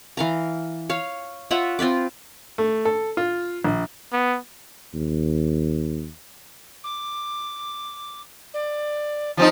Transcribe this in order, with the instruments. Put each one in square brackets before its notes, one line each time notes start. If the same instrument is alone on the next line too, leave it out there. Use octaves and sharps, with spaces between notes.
[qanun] E3 F5 A#5
C#5 F5
F4 C#5 E5 F#5
C4 F4 B4 D6
[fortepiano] A3
A4
F4
A#1
[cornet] B3
[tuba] D#2
[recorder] D6
D5
[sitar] F3 C4 D#4 [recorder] A6